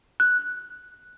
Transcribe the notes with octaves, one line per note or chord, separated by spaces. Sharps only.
F#6